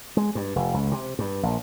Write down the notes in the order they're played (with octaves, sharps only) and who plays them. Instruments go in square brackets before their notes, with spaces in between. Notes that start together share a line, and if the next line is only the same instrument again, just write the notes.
[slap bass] G#3
G2
F1
C#2
C3
G2
A#1